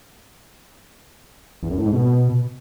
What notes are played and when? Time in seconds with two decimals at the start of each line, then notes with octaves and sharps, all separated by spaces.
1.63 E2
1.70 F#2
1.78 A2
1.86 G#2
1.93 B2